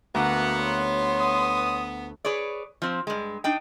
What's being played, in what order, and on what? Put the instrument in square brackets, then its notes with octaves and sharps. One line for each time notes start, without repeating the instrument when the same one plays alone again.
[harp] D2 A#5 D6 [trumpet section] A#3 F#5 [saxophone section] B3
[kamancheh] C#5 C6
[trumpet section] D#6
[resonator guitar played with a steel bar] G#4 B4 C#5 D5
F3 C4
G2 G#3
D4 D#4 G5